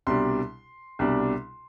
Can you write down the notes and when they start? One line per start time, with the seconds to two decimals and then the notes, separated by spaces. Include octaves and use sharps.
0.07 C2 B2 G3 D4 C6
0.99 C2 B2 G3 D4